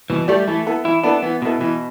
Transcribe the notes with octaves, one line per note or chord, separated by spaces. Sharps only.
B2 E3
G3 A3 G4 D5
E3 A3
B3 E4 A4
E3 E4
B3 D4 E4 A4
E3 B3
B2 B3 E4 A4
B2 E3